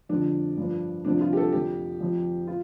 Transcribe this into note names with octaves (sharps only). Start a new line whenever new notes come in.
F2 D3 F3 D4
G2 F3
C2 C3 F3 D4
F4
G4
A4
F2 F3 G4
F2 F3
F4